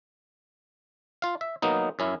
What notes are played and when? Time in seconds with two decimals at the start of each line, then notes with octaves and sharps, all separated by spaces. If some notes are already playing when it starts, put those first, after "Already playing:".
1.22 F4 F5
1.41 E5
1.62 F#3 A#3 B3 D#4
1.99 F#2 C#4 E4